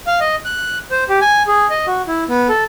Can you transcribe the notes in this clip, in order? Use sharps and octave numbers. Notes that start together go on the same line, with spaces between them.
F5
D#5
F#6
C5
G4
G#5
G#4
D#5
F#4
E4
B3
A4